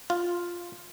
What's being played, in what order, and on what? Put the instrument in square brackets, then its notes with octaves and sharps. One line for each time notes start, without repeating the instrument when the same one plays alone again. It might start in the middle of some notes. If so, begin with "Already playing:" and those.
[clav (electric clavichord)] F4